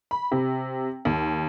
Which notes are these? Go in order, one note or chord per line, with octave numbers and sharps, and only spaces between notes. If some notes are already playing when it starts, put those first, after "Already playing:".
B5
C3
D#2